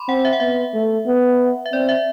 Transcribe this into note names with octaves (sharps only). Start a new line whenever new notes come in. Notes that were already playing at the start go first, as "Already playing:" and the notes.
Already playing: B5 C6 D6
C4 F#5
E5
F#5
B3 E5
A3
B3
E5
C4 D5
E5